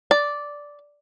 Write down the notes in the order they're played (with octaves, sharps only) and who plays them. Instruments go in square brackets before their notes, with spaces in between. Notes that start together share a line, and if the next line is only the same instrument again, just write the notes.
[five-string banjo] D5